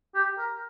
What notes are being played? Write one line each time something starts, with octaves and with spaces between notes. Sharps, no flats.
G4
A#4